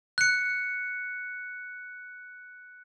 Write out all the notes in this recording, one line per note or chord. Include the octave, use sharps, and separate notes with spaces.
F#6 C#7